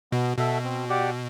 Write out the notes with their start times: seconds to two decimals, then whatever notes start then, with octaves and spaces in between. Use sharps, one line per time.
0.12 B2 B3
0.38 B2 F#4 A4 E5
0.64 C4
0.89 G4 D5 F#5